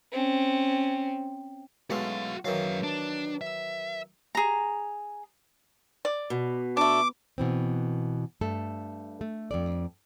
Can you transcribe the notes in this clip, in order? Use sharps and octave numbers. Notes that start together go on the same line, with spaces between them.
C4 C#4
B1 G#3 A3 F#4 F5
F#2 D#3 E3 F#3 F5
D4
E5
G#4 A#5
D5
B2
A3 D4 D6
B2 E3 C4
G2 A3 A4
A3
F2 G#2 D5